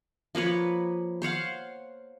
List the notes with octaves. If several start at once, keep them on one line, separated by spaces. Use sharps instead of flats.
F3 A#3 B4 C#5
C5 C#5 F5 F#5